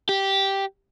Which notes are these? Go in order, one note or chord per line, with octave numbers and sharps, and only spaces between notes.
G4